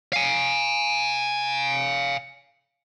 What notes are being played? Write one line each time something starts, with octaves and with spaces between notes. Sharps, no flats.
F5 G#5